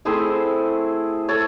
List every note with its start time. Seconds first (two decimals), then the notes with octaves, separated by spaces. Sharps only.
0.05 A3 C4 E4 G#4 C5
1.29 A4 C#5